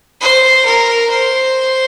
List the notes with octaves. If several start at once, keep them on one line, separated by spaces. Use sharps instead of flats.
C5
A#4
C5